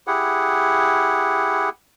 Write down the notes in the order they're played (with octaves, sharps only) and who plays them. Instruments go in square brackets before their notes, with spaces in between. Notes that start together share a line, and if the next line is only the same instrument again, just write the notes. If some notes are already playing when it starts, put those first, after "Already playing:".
[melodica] E4 G4 G#4 F#5